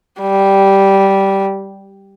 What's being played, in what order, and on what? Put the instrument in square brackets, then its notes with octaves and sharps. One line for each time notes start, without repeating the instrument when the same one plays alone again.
[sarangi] G3